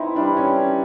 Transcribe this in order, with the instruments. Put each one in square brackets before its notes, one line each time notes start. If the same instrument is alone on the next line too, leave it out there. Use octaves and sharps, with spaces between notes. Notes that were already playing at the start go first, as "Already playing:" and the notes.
Already playing: [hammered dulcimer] E3 C4 [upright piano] D#4 E4
[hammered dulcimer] G3 [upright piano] D4
[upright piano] C#4